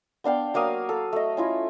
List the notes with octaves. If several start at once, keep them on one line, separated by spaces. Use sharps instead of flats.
B3 D4 F5 G5
F#3 A#3 F5 D#6
A4
A3 D#5
C#4 E4 F4